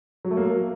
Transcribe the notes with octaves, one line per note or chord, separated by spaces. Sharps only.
F#3
A3
A#3